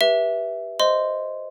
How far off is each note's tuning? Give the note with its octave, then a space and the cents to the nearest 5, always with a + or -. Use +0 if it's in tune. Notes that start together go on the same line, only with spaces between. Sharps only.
G4 +0 B4 -20 E5 +0
C5 +0 D#5 +0 C6 -10